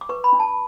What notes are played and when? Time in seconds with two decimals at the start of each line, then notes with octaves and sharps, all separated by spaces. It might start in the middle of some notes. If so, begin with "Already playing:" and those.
0.01 D6
0.09 B4 C#6
0.24 B5
0.33 D4
0.40 A5